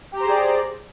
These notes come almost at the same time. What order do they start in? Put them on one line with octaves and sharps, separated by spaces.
G4 A#5 C5 G#4 D5